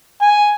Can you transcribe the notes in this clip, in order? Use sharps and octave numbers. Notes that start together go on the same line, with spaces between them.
G#5